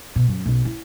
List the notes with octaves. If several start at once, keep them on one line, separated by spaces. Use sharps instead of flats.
B2
F#2
B1
E4